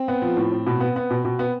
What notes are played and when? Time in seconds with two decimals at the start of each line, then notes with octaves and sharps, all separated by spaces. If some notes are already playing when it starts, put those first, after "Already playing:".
Already playing: C4
0.08 B3
0.22 F3
0.37 A2
0.51 A2
0.67 B2
0.80 B3
0.96 B3
1.10 B2
1.25 B2
1.39 B3